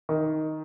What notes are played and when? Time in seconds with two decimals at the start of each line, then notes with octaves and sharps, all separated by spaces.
0.09 D#3